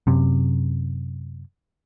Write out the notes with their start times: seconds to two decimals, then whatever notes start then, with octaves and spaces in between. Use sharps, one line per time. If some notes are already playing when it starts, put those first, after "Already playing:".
0.07 F#2 C3